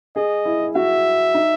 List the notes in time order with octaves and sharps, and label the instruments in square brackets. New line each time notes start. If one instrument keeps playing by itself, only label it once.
[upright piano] G#4 [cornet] D#5
[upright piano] E4
[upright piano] F#4 [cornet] E5
[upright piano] D#4